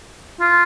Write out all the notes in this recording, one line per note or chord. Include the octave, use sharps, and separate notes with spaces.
F4